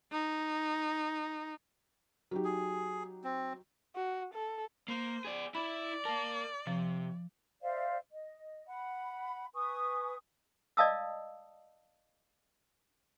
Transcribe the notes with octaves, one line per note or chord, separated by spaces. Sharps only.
D#4
F#3 D#4 G4
G#4
C4
F#4
A4
A#3 C5
G#4 D5
E4 D5 E5 B5
A#4 F5 A5
C3 F3
C5 D5 E5 F5
D#5
F#5 B5
B4 G#5 C#6 D#6
D5 D#5 F5 A5 D#6 E6